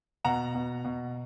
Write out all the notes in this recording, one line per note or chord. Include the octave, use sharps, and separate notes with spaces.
B2 F#5 A#5
B2
B2